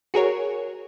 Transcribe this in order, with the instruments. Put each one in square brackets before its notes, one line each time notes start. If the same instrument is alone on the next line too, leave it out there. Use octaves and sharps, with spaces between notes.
[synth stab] F#4 G#4 A#4 C#5